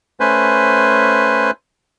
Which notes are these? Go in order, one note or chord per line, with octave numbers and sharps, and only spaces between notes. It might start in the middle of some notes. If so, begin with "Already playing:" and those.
A3 C#4 B4 C5 G#5